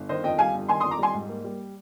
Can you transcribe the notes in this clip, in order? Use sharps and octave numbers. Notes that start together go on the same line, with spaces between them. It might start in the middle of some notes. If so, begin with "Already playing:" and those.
Already playing: G1
D#3 C5 D#5
F2 D#5 G5
G3 F5 G#5
G1
D#3 G#5 C6
F2 C6 D#6
A#5 D6
G3 G#5 C6
G#2
A#3
G3